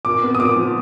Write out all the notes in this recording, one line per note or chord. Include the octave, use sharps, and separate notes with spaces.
A#2 D6
B3
D#6
A#2 D6
F3